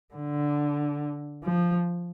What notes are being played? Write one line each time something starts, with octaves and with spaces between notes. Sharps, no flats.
D3
F3